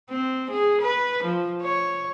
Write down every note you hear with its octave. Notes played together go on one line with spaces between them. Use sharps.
C4
G#4
B4
F3
C#5